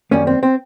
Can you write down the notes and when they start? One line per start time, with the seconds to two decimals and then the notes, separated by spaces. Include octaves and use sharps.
0.11 F#2 D#3 G3 A#3 C#4
0.27 C4
0.43 C4